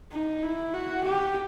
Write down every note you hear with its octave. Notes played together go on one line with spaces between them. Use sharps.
D#4
E4
F#4
G4